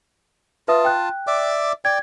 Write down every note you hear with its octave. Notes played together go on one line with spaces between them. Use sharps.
F4 B4 E5 A5 D#6
G5 F#6
D5 E5 D6
D5 G5 G#6